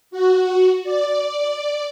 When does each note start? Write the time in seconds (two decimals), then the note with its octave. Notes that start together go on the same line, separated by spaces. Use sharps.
0.11 F#4
0.84 D5